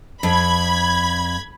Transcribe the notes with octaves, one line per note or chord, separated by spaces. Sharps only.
F2 B5 G#6